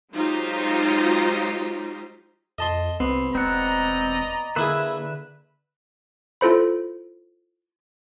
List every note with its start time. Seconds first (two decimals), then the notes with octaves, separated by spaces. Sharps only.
0.13 F#3 G#3 D#4 F4 G4 C5
2.58 F2 D#5 A5 C6
3.00 C2 B3 C4
3.35 E1 C4 D5 D#5 F#5 A#5
4.56 D3 A#3 E4 G#4 B4 E5
6.41 E4 F4 A4 C5 B5